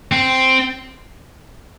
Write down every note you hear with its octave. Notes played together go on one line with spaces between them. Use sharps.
C4